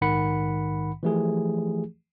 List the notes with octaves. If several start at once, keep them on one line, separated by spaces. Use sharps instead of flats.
A#1 G#2 D#3 F#5 B5 C#7
E3 F3 A3 G4 G#4